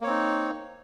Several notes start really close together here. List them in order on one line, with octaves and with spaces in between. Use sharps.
A#3 C#5 C4 D#4